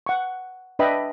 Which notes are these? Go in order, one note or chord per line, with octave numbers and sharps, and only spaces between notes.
F#5 C#6
D4 B4 D#5 E5 G5 B5